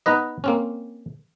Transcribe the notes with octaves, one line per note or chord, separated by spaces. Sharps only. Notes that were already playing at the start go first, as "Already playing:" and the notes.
B3 D#4 B4 D#5
A#3 C4 C#4